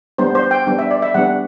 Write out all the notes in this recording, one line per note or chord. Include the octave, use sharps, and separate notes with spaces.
G3 B3 D4 C5
C5
G5
G3 B3 D4
E5
D5
E5
G3 B3 D4 F#5